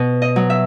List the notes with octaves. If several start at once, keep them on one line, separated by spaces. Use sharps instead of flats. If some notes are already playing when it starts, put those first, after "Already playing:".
Already playing: B2
D#5
F#3
E5